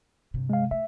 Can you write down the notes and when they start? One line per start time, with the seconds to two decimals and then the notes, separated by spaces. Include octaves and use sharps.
0.34 G2 C3
0.50 G#3 F5
0.71 A3 E5